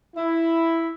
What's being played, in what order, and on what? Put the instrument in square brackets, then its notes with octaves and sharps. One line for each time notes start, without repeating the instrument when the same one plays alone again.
[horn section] E4